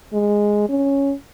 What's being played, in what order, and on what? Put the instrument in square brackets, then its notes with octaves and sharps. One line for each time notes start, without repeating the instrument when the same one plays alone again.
[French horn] G#3
C#4